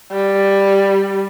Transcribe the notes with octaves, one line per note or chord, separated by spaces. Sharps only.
G3